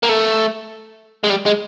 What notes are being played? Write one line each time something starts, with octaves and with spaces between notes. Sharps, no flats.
A#3
A3
G#3
G3
G#3